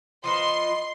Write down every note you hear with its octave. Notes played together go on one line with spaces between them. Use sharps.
F3 D#4 B4 C6